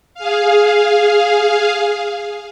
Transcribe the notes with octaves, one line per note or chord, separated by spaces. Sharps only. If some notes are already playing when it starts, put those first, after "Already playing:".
G#4 F5